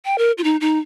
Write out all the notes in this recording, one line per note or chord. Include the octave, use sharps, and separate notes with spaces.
G5
A#4
F4
D#4
D#4